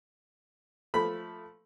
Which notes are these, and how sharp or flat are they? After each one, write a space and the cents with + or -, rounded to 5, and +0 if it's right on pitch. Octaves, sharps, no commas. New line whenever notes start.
F3 +5 A3 +0 B5 +0